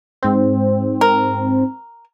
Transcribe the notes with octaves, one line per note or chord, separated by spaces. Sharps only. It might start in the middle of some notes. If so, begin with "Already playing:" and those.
G#2 C4
A#4